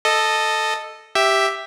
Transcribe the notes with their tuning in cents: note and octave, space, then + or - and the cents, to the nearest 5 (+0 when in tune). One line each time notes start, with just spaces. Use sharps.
A4 +0 D#5 -10
G4 +0 E5 +0